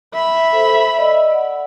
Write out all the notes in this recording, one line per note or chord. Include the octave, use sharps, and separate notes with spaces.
E5 B5
A4 C5
D5 D#5 E6
D5 F#5